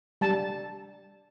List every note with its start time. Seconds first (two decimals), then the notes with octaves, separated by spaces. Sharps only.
0.21 G3 A5